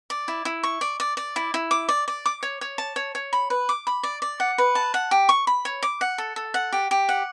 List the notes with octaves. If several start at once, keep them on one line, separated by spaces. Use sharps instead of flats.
D5
E4
E4
C#6
D5
D5
D5
E4
E4
D6
D5
D5
D6
C#5
C#5
A5
C#5
C#5
B5
B4
D6
B5
D5
D5
F#5
B4
A5
F#5
G4
C#6
B5
C#5
D6
F#5
A4
A4
F#5
G4
G4
F#5